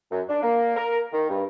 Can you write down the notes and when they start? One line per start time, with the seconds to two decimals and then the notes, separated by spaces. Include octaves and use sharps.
0.11 F#2
0.29 D4
0.42 A#3
0.76 A#4
1.13 D#3
1.30 G2